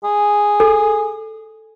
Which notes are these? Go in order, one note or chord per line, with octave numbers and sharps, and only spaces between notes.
G#4
A4